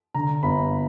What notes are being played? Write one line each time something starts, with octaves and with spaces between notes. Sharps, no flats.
D3 A#5
G1 B5